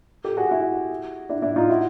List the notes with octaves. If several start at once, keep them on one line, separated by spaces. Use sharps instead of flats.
G4 A4
F#4 G#4
E4 F#4
D4 E4
D4 E4
D#4 F4
E4 F#4